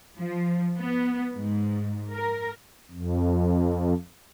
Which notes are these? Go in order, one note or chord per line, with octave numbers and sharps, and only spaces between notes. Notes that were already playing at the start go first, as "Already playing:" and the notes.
F3
B3
G#2
A#4
F2